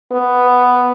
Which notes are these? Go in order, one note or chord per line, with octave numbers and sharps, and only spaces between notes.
B3